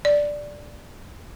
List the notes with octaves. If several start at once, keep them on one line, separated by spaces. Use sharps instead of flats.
D5